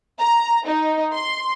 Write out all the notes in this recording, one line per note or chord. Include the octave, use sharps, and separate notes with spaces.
A#5
D#4
C6